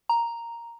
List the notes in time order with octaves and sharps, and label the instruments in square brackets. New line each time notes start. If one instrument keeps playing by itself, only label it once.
[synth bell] A#5